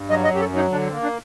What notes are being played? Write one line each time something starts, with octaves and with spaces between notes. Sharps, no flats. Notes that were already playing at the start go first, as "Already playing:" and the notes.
Already playing: G2
F#3 D#5
D#5
F#2 G4
A4
F#3 D#4
D3 D4
C4
A#3
D4